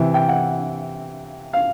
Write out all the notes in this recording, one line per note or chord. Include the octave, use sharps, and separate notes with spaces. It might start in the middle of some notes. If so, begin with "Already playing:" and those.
Already playing: C3 E3
G5
F#5
F5